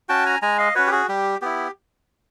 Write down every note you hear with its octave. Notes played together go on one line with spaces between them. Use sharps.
C#4 F#4 G5 A5
G#5 A#5
G#3 G#5 A#5
D#5 F5
C#4 F#4 B4 C#5
G4
F#4 G#4
G3 G4
B3 E4 G4